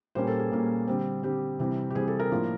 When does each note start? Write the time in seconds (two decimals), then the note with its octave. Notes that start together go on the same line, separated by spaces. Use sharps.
0.15 A#2 G3 A#3 C#4 C5
0.27 A4
0.40 G#4
0.51 A#2 G3 A#3 C#4
0.87 D3 G3 C4
1.23 D3 G3 C4 G4
1.59 C3 E3 G3 C4
1.90 G4
1.95 C3 E3 G3 C4 G#4
2.08 A4
2.20 A#4
2.32 A2 F3 A#3 D4 F4